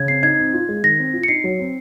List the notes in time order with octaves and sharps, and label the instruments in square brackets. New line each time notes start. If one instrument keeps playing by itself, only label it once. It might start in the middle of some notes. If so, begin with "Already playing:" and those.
Already playing: [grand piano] C#3 [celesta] G#6
[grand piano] C4 [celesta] C7
[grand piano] D#4 [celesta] G#6
[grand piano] C4
F4
G#3
[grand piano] D#3 [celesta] A#6
[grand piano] C4
F4
[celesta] C#7
[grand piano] D#4 [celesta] C7
[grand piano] F#3
C4